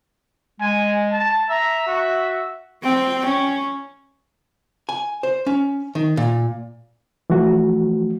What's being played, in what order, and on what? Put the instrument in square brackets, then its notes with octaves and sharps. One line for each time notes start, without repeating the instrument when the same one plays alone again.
[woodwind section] G#3 [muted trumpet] G#5
[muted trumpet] A5
[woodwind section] E5 [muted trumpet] A#5
[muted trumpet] F#4
[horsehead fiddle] C4 G5
C#4
[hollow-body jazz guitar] G#5
C5
C#4
D#3
A#2
[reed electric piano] E3 F3 A3 F#4